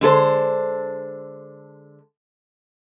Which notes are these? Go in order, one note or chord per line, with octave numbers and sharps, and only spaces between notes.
D3 G#3 A4 C5